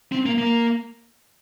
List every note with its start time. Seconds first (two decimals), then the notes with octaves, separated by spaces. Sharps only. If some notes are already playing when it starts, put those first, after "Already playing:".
0.12 C4
0.26 A#3
0.38 A#3